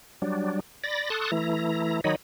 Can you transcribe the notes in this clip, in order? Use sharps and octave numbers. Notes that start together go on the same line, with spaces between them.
F#3 G3 D4
D5 B5 A6 A#6
A4 A5 C6 C#6 D#6 F#6
E3 A3 E4 A#5
D#3 F#3 D#4 C#5 D#5 B5